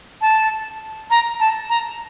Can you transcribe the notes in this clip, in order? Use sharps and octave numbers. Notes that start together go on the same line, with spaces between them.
A5
A#5
A5
A#5